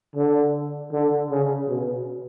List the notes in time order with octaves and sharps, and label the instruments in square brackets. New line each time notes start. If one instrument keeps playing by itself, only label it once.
[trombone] D3
D3
C#3
B2